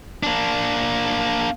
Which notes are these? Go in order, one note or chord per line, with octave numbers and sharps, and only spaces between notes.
A#3 D4